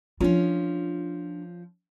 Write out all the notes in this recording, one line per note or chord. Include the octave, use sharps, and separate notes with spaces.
F3 C#4 D4 F4